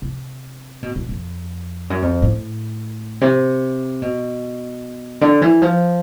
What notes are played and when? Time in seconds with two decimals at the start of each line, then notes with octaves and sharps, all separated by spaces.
0.02 C3
0.83 B2
0.96 B2
1.09 F2
1.90 F#2
2.02 F2
2.22 A2
3.21 C3
4.02 B2
5.21 D3
5.42 E3
5.62 F3